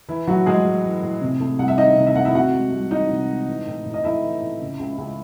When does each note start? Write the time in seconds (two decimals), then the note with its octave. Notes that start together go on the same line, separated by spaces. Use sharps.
0.09 E3 E4
0.27 A2 F#3 F#4
0.46 A2 G#3 G#4
0.65 G#3
0.84 E3
1.03 A2
1.22 C3
1.40 A3
1.59 C2 F#5
1.68 E5
1.78 D#3 D#4 D#5
1.97 C3
2.06 E5
2.15 A3 F#5
2.25 E4 E5
2.35 C3 F#4 F#5
2.53 G#3
2.72 C2
2.91 E3 D#4 D#5
3.10 C3
3.29 G#3
3.48 E3
3.67 A2
3.86 A2
3.94 D#5
4.04 A3 E4 E5
4.23 E3
4.41 A2
4.61 C#3
4.79 C#2
4.98 C#2